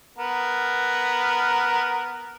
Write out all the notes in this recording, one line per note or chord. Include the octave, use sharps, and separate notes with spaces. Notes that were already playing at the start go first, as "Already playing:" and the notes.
B3 A#4